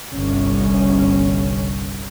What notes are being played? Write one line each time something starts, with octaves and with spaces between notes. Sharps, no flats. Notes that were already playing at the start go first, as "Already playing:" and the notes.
G1 C2 C#4